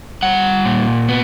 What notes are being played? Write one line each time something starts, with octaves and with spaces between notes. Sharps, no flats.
G3 F#5
A#2
B3